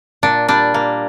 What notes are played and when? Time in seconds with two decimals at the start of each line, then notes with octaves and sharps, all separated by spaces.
0.23 A#2 D4
0.48 G3 D4
0.74 A#3